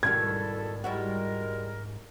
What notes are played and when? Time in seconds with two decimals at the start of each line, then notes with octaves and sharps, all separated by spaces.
0.03 C#2 G#2 B2 D#3 G3 E4 A4 G#6
0.84 G3 G#3 E4 F#4 A#4